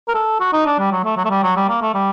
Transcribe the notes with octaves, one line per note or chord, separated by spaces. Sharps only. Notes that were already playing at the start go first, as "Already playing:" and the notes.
A#4
A4
F#4
D#4
D4
G3
F#3
A3
F#3
A3
G3
F#3
G3
A#3
A3
G3